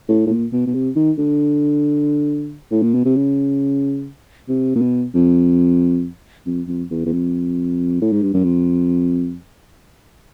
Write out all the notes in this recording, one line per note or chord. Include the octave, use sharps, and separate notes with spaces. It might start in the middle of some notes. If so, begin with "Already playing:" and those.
A2
A2
A#2
B2
B2
C3
D#3
D3
A2
A#2
B2
C3
C#3
C3
A#2
B2
F2
F2
F2
E2
E2
F2
A2
G#2
G2
F#2
F2